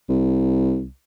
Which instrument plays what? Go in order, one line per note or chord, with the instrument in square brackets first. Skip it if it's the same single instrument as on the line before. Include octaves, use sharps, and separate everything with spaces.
[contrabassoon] C2